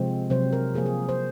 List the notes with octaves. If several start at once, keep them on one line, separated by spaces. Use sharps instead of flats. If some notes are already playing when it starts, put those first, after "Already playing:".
Already playing: C3 F3 G#3 C4
C3 F#3 C4 C5
A#4
C3 F3 A#3 G#4
G#4
C5